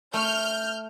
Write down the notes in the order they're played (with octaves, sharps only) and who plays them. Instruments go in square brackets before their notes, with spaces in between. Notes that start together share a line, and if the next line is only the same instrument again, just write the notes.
[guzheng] A3 [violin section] F6 G6